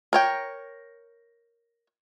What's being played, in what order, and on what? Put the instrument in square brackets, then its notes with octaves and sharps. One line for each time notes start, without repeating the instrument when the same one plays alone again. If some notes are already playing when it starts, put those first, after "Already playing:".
[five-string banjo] A#4 C#5 G5